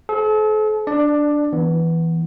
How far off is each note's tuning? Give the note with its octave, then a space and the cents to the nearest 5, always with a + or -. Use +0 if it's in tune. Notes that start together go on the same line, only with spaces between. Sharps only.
A4 -40 C5 +0
D4 -5 D5 +15
E3 +0 B3 +0